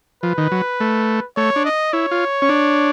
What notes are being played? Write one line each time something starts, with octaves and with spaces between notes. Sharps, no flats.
F3 B4
D#3
F#3
A3
A3 C#5
D4
D#5
E4 C#5
F4
C#4
D4